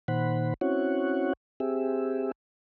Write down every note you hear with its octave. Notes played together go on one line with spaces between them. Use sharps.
A#2 D#3 C5 F#5 B5
C4 C#4 E4 F#4 C#5 F#5
C4 G4 G#4 E5